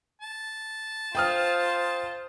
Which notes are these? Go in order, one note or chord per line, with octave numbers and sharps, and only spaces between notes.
A5
F4 C5 G5 D#6 F6